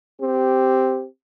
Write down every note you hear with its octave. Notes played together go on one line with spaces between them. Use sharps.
C4 G4